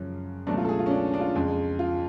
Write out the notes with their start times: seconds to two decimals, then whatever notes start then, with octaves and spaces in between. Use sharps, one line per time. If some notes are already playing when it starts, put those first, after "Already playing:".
Already playing: F#2 C#3 F3 G#3 C#4
0.47 C#2 B2 F#3 A3 D4
0.57 F4
0.65 A4
0.69 G#4
0.79 F4
0.86 C#4
0.91 D4
1.14 D4
1.20 F4
1.35 F2 C#3 G#3
1.79 F4